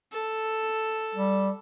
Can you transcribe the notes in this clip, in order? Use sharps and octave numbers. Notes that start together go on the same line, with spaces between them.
A4
G3